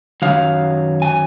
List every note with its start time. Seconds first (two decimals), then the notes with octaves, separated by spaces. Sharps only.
0.22 F#2 D#3 F#3 F5
1.02 G#5